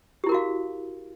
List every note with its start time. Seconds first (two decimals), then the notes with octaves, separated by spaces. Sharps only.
0.24 G4
0.26 E4
0.29 A#4
0.32 F#4
0.34 F5